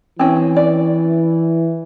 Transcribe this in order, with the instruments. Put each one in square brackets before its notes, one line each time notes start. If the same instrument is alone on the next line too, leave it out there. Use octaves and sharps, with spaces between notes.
[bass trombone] E3 [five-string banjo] C4 C#4
[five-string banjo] D5